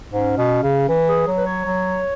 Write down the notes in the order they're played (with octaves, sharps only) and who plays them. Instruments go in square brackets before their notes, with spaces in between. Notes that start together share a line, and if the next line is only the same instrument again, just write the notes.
[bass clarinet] G#2 [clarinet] C#4
[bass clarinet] B2
C#3
E3
[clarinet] G#4
[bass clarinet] F#3
[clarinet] B4
C#5
[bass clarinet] F#3